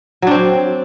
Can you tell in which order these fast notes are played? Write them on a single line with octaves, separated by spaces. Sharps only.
F#3 D4 C4